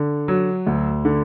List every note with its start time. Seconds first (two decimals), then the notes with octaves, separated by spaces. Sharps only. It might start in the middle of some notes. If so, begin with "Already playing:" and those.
Already playing: D3
0.28 F#3
0.66 D2
1.05 D3